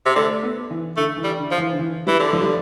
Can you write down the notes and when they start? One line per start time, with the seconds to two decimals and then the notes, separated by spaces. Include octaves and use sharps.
0.06 C3
0.16 D3 A3
0.43 B3
0.71 E3
0.97 D3 A3
1.17 E3
1.24 G3
1.39 D3
1.51 F3
1.58 E3
1.73 D3
1.79 E3
2.07 E3 G3
2.20 D3
2.33 F3
2.42 G3